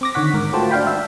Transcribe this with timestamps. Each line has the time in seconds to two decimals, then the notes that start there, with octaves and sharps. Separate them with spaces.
0.01 C4 D6 A#6
0.14 D3 D#3 C#5 F#5 B6
0.34 G#2 A#4 D6
0.53 A3 F4 F#4 C5 G5 A5
0.71 D4 F4 F5 G5 B5
0.87 E5